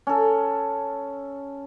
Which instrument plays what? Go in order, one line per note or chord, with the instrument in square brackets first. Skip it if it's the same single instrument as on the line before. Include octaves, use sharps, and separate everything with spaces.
[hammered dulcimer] C#4 A4